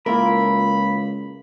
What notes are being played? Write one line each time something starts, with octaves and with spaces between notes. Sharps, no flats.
C#2 A#3 E4 F4 A#4 B5